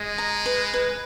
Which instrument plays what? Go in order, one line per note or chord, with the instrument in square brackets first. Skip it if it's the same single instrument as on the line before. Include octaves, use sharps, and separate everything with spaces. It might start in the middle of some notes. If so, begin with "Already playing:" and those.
Already playing: [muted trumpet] G#3 [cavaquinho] D#5
[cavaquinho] A#5
B4
B4